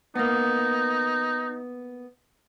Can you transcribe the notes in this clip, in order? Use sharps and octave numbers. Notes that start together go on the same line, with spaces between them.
A#3 B3 D#4